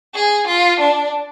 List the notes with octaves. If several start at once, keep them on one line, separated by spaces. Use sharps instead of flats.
G#4
F4
D4